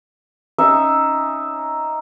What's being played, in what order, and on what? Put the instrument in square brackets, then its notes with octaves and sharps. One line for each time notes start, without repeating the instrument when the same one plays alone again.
[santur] C#4 D#4 E5